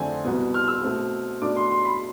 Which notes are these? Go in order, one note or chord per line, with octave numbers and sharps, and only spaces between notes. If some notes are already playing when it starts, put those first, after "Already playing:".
Already playing: F2 D3 A3 C4 G#5
C2 B2 B3
F6
E6
B2 A3 C4
B2 A3 D4 D6
C6
C6
B5